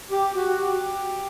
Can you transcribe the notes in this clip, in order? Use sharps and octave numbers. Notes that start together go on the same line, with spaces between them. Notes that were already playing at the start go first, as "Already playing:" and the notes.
G4
F#4
G4